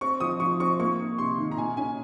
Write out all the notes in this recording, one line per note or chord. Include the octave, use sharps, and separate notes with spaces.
C4 C#6
F3 D#6
F3 C#6
C4 C#6
A#3 C#6
A#3
C3 C6
D#3
A#5
A#2 G#5
C#4 G#5